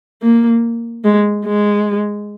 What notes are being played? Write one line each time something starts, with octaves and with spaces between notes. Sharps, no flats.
A#3
G#3
G#3